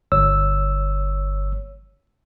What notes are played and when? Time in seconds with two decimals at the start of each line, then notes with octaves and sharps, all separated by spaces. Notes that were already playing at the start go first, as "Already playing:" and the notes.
0.12 G1 C#5 E6